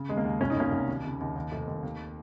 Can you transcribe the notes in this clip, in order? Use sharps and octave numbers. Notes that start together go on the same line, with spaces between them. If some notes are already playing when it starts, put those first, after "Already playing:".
Already playing: C#3
D#2 G#3
A#3
D#2
C2 C#4
D#4
C2 A#3 C#4
C2
D#2
C#3
D#2
D#2
F1
D#2
D#2